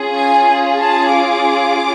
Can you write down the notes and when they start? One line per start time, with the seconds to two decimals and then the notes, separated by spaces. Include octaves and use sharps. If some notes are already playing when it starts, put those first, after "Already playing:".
Already playing: C#4 F4 G#4
0.15 G#5
0.79 A5
1.12 D6